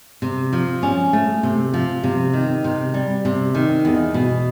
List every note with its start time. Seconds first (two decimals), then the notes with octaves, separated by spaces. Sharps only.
0.22 C3
0.53 F3
0.83 C#4
1.13 A3
1.43 C3
1.74 F3
2.03 C3
2.33 D#3
2.64 C3
2.94 G3
3.25 C3
3.55 D#3
3.85 E2
4.14 B2